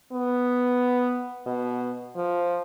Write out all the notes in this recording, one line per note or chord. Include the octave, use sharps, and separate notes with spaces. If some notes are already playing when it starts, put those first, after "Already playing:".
B3
B2
F3